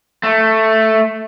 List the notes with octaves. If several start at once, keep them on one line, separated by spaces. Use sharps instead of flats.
A3